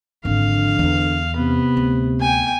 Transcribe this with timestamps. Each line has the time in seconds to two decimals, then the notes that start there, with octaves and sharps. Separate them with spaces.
0.25 G#1 D3 F3 F5
0.79 E2 D4
1.36 C3 B3
1.77 D2
2.20 G5 G#5